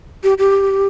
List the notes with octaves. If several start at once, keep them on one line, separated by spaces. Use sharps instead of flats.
G4
G4